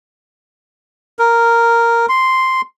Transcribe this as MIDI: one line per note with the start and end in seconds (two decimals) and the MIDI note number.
1.19 2.06 70
2.09 2.61 84